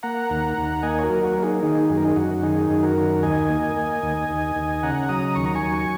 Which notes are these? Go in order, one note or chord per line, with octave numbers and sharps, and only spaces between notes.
A#3 F#5 A#5
D#2
D#2
A#3 D#5 G#5
C#5
F#4 A#4
F#3
F#4
A#3 A#4
D#4 G#4
D#3 D#4 G#4
F#2 G#4
A#4
D#4 G#4
F#2 F#4
D#3 D#4 G#4
F#2
F#4 A#4
D#3
D#2 D#5 G#5
A#3
A#3
D#2
D#2
D#2
C#3 F#5 A#5
F#3 A#5 D#6
D#2 C#6
A#5
G#5 C#6
F#3